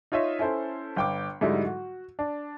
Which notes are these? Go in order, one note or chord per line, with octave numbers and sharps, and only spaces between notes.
D#4 F4 C#5 D#5 E5
C#4 E4 A4 C5
G1 G5 D6
G#2 D3 F#3 G3 D#4 E4
F#4
D4